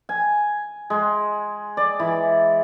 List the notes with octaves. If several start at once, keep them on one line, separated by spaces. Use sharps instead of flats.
G#5
G#3
D5
E3